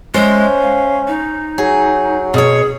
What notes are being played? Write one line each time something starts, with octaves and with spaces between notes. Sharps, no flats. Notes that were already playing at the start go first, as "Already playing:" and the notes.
G#3 C#4 C5 E5
F5
D#4
F#3 G#4
B2 G#4 C#5